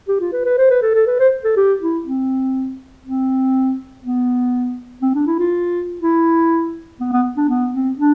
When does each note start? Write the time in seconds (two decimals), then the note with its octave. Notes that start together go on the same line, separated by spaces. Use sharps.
0.08 G4
0.21 F4
0.33 B4
0.45 B4
0.58 C5
0.70 B4
0.82 A4
0.95 A4
1.07 B4
1.20 C5
1.44 A4
1.57 G4
1.81 E4
2.06 C4
3.05 C4
4.04 B3
5.02 C4
5.15 D4
5.27 E4
5.39 F4
6.01 E4
7.00 B3
7.13 B3
7.37 D4
7.49 B3
7.74 C4
7.99 D4